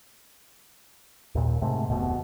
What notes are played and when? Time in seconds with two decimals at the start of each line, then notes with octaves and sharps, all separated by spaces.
1.35 D#2 A#2
1.62 G#2 C3 A3
1.90 F1 D2 B2